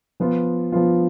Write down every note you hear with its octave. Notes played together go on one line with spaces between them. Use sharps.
F3 B3 F4
F3 B3 F4